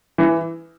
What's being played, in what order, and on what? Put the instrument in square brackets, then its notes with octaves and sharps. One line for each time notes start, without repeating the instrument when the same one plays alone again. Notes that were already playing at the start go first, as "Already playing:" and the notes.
[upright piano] E3